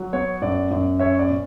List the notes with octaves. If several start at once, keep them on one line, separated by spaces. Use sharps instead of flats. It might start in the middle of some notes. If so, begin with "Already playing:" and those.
Already playing: F#3
B3 C#5
F#2 D5
F#2
C#4 C#5 E5
D5
B2